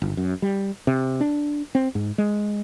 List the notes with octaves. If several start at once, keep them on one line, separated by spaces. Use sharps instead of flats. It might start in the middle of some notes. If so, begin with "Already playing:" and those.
G1
F#2
G3
C3
D4
C4
G#2
G#3